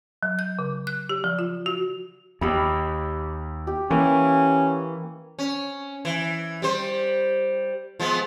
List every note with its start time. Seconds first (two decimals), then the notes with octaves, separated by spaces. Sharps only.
0.23 F#3
0.39 G6
0.59 C#3
0.87 F#6
1.09 G4
1.24 F3
1.39 F4
1.66 F#4
2.41 D#2 G4 B5
3.67 G4
3.91 E3 A#3 C#4
5.39 C#4
6.05 E3
6.62 G3 C5
8.00 F3 G#3 B3